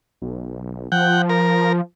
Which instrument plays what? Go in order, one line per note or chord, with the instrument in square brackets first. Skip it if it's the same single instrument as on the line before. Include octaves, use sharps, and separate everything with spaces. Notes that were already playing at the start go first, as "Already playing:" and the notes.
[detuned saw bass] B1
[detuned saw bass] F3 [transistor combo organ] F#5 G5
[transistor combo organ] A#4